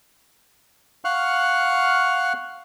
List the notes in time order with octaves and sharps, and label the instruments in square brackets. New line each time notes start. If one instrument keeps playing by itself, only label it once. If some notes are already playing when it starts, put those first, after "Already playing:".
[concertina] F5 F#5 C#6 F6 F#6